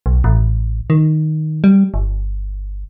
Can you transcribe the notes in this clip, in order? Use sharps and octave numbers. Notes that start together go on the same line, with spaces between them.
B1
A1
D#3
G3
G1